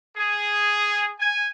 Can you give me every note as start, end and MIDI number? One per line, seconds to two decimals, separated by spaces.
0.17 1.12 68
1.19 1.49 80